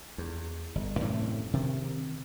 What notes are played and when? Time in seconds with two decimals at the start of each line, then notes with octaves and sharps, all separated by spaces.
0.18 E2
0.75 G1
1.00 F#2 A2 C3 E3
1.53 C3 D#3